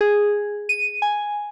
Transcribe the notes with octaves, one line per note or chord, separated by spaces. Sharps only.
G#4
D#7
G#5